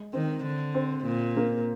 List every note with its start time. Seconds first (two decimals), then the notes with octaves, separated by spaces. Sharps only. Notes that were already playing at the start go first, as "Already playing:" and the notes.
Already playing: G#3
0.13 D#3 C4
0.45 D3
0.74 C4
1.05 A#2
1.37 A#3